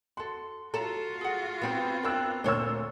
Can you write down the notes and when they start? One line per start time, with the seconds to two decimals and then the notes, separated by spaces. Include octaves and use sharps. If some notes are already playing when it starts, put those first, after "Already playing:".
0.17 F#4 A4 C6
0.74 F4 F#4 A4 C#5 A5 A#5
1.21 G#4 F#5
1.61 B3 C4 B4
2.03 D4 A#4 G5 E6 F#6
2.44 D2 A#2 C5 C#5 E6